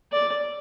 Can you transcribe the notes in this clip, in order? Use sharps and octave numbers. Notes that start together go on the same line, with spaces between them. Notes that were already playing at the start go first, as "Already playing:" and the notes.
D5